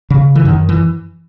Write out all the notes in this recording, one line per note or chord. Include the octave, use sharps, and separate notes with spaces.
C#3
E3
F#2 D#3
E3